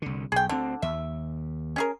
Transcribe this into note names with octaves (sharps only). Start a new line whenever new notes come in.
C2 D3
B1 G#4 G5
D2 D3 C4
D#2 E5
C#4 G#4 A#4